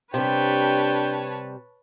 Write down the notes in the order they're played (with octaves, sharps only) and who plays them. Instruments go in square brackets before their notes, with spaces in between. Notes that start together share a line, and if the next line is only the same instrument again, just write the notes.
[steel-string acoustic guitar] C3 G3 [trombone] D4 [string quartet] B4 C#5 A5 [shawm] G5